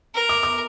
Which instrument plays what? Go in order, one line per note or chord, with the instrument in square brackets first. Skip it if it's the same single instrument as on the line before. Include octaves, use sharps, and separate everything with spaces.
[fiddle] A#4
[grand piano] D6
D6